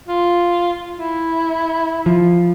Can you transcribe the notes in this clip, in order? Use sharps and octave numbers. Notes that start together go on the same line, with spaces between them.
F4
E4
F3